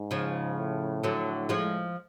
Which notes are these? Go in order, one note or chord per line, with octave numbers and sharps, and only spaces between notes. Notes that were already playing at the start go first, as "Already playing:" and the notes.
Already playing: G#2
C#3 F3
A2
D3 F#3
F3 G#3